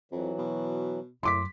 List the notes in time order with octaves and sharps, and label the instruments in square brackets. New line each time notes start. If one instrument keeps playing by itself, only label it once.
[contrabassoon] F2 [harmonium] E3 F#3
[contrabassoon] B2
[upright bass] F#2 [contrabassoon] A2 [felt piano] C6 D6 B6